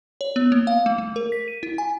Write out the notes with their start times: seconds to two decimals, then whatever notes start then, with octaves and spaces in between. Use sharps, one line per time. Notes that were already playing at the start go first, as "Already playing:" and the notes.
0.21 C#5
0.36 B3
0.52 A#3
0.67 F5
0.86 A3
0.98 A3
1.16 A#4
1.32 B6
1.48 D#7
1.63 E4
1.78 G#5